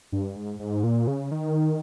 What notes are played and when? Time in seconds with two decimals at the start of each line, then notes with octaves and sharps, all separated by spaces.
0.12 G2
0.36 G#2
0.59 G#2
0.84 A#2
1.07 C#3
1.31 D#3